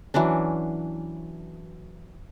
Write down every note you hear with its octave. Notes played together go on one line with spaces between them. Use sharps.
E3 F#3 C#4 D4